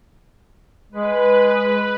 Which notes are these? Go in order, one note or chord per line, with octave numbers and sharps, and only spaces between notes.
G#3 B4